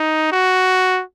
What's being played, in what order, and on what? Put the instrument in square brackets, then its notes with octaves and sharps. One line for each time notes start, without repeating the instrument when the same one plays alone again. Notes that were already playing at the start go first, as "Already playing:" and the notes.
Already playing: [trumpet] D#4
F#4